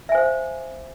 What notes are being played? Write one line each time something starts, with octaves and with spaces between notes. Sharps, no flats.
C5 E5 F5 G#5